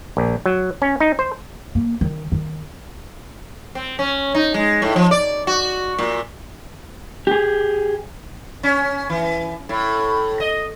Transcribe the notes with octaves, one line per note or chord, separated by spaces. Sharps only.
A#1
F#3
C#4
D#4
C5
A#3
D#3
D#3
C4
C#4
D#4
G#3
A2
F3
D5
F#4
A#2
G4 G#4
C#4
E3
A2
D#5